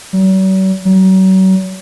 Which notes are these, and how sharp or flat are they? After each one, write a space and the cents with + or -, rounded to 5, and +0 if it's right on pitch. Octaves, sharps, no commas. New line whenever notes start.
F#3 +45
F#3 +35